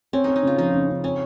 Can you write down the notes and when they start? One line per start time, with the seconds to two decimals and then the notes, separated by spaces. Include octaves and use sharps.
0.13 C4 C#4
0.24 C4 D#4
0.36 D#4
0.43 C#3 F4
0.58 F3 D#4
0.74 C#3
0.89 C#3
1.04 C4 C#4